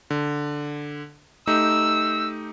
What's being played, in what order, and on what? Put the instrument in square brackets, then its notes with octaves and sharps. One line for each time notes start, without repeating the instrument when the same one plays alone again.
[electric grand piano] D3
[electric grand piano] A3 D#4 G4 [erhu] E6